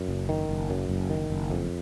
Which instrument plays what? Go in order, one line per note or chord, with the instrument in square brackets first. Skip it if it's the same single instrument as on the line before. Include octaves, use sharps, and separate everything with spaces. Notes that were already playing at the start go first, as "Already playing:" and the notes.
Already playing: [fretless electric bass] F#2
F#1
D#3
F#1
F#2
F#1
D#3
F#1
F2